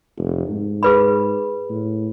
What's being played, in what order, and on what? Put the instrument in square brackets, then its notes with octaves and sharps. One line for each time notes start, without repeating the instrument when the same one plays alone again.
[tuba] F1
G#2
[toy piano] G#4 B4 B5
[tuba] A2